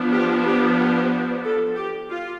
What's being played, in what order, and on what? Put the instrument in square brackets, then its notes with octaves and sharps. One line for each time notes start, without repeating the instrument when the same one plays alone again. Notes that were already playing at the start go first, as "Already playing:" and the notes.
Already playing: [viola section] F3 B3 D4
G4
G4
G4
A4
G4
F4